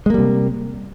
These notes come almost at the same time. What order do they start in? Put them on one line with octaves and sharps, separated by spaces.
G#3 A#3 G3 C3